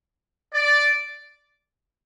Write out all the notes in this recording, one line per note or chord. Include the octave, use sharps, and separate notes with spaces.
D5